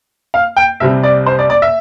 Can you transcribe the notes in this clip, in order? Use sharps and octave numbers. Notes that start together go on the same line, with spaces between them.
F5
G5
C2 C3 G3 E5
D5
C5
D5
D5
E5